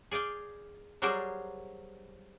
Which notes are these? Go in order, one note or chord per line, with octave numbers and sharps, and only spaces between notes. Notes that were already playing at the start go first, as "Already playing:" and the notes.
G#4 D5 F5 G5
F#3 G3 G#4 A#4 C5 D5